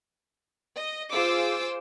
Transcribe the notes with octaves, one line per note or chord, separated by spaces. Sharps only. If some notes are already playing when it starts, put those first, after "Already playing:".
D#5
F4 G#4 C5 D6 E6